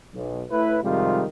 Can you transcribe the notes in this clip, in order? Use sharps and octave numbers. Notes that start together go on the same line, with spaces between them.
B1
A2 E4 B4
F2 C3 D#3 G3 G#3 F4